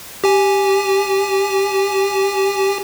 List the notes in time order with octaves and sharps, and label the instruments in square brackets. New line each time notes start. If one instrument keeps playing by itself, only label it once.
[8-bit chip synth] G4 G#5